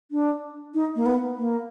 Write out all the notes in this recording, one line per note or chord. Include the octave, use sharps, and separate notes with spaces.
D4
D#4
A#3
B3
A#3